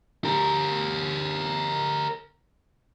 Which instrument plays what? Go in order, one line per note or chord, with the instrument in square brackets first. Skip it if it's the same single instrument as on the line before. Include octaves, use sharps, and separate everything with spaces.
[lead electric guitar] G4 A#4